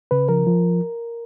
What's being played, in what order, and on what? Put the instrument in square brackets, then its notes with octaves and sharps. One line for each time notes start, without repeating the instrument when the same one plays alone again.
[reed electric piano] C#3 B4
F3 A#4
F3